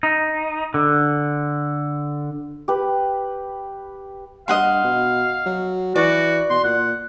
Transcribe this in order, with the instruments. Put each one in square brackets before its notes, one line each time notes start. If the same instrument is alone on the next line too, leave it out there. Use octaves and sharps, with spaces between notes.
[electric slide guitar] D#4
D3
[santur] G4 B4
[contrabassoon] G2 [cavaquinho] D#5 F#5 C6 [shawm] F5
[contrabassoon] B2
F#3
[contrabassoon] E3 [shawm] F#4 [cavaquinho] D5
[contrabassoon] B2 [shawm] C6
[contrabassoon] A#2 [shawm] F#5